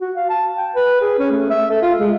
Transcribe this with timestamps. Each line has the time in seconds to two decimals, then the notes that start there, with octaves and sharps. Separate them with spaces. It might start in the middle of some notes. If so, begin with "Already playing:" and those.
0.01 F#4
0.16 F5
0.29 A5
0.57 G5
0.75 B4
1.01 G#4
1.19 C#4
1.31 A3
1.50 E5
1.70 A4
1.82 F4
1.99 G#3